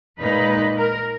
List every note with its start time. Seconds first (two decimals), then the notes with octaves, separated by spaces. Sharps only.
0.19 A#2 G#3 D#4 B4
0.76 A#4